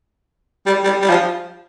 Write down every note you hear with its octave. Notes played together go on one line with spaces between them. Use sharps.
G3
G3
G3
F3